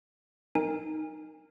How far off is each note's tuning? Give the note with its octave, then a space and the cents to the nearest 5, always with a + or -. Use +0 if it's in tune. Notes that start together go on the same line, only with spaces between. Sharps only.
D#4 +0 A#4 -10 G#5 -35